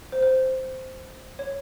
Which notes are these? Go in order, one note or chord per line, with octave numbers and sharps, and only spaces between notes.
C5
C5
C#5